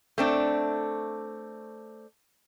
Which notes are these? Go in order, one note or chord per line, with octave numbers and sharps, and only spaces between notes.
A3 C4 D4